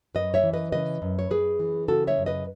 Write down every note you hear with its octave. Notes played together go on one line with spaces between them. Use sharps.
F#2 B4 D#5
C#5 E5
E3
B4 D#5
C#3 B4 D#5
F#2
C#5
F#2 G#4 B4
E3
C#3 F#4 A4
C#5 E5
F#2
B4 D#5